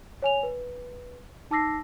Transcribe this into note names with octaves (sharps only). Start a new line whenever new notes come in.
C#5 G#5 F7
B4
D#4 A5 D6 E6 A#6 C7